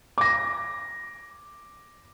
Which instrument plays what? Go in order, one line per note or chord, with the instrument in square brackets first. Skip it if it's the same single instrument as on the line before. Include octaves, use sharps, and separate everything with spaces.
[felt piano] D6 A#6